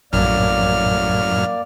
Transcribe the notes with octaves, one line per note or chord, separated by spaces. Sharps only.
A#1 F#2 A2 F#3 A#3 D5 F6